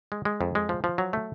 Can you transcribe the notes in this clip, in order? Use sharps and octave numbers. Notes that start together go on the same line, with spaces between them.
G#3
G#3
F2
G#3
F3
F3
F#3
A3